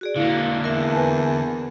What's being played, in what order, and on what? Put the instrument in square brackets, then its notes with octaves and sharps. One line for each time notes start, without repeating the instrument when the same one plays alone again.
[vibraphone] F#4 G#4 D5
[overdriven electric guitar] D3 A#3 [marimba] E4 [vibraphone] F5
[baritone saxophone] E2 [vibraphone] A#4 E5
[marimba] B4 G#5 A5